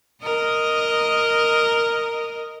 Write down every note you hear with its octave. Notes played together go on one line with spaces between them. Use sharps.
A#4 D#5